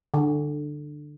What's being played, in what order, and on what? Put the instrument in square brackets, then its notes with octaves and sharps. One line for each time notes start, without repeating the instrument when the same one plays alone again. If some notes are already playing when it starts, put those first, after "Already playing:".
[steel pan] D3